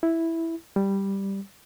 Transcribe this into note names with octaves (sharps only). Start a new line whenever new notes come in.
E4
G3